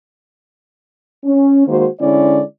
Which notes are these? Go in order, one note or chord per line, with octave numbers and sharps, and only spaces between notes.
C#4
D#3 G#3 A#3 F#4 C5
D3 G#3 C#4 E4 D5